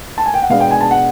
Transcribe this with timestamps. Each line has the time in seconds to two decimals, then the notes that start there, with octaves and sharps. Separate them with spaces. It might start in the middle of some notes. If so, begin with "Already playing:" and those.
0.18 A5
0.26 G#5
0.34 G5
0.42 F#5
0.49 B2 G#3 B3 D4 F5
0.60 G5
0.71 G#5
0.81 A5
0.91 F#5